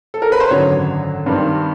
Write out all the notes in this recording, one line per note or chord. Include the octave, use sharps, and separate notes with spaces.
A4
A#4
B4
C5
G#1 F#2 D3 F#3 C#5
G2 D#3 G3 C4